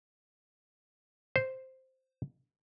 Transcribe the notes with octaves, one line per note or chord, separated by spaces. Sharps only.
C5